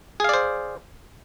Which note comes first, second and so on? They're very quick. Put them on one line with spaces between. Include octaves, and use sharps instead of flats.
G#4 F5 D5 C5